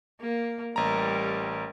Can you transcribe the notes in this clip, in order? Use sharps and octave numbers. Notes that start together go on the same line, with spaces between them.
A#3
A1 G3 G4 A#4 A#5